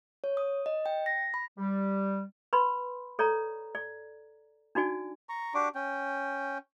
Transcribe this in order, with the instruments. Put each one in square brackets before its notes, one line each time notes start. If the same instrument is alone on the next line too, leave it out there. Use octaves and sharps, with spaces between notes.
[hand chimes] C#5
D#6
D#5
G5
A#6
B5
[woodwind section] G3
[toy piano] B4 B5 C6
A4 C#5 D5 A#5
D5
D4 D#4 F#4 D5 G#5
[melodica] A#5 C#6
D4 F#4 G4 D6
C#4 G5